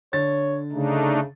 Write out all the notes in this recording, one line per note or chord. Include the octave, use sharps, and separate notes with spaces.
D3 C#5 A6
C#3 A3 D4 D#4